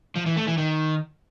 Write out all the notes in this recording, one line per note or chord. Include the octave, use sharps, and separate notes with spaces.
F3
E3
A3
E3
D#3